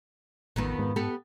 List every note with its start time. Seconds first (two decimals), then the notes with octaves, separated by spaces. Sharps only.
0.56 A1 F2 D#3 B3
0.79 G#2
0.96 B3 G4 A4